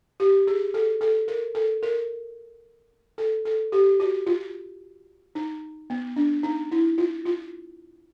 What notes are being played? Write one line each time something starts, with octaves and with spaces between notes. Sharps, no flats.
G4
G#4
A4
A4
A#4
A4
A#4
A4
A4
G4
F#4
F4
D#4
B3
D4
D#4
E4
F4
F4